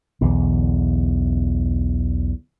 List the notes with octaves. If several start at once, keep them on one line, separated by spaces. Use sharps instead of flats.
B1 E2 D3